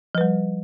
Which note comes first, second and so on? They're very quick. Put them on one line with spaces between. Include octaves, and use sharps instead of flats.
F3 B4 G3